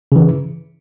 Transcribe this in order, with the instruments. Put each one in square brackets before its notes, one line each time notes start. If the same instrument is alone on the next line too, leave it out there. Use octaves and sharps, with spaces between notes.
[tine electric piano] C#3 E3